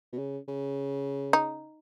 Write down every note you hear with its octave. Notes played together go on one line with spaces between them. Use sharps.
B2
C#3
C#3
D#4